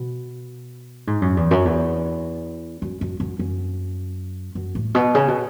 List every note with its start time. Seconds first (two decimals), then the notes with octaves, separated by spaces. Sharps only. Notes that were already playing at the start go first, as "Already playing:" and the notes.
Already playing: B2
1.07 G#2
1.22 F#2
1.37 E2
1.51 F#2
1.65 E2
2.82 F#2
3.01 F#2
3.20 F#2
3.39 F#2
4.55 F#2
4.75 A2
4.95 B2
5.15 C#3
5.28 B2